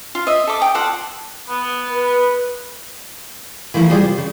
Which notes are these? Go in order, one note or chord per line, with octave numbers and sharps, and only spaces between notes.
F4
D#5 E5
A4 D6
G5 D#6
F4 A4 D5 F#5
B3
B4
E3 F3 A3 E4 A#4
G3 F4 G#4 C5 G#5
C3
C#3